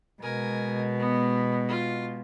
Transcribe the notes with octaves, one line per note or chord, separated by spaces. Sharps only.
B2 G#3 A#4 G#5
B3
F4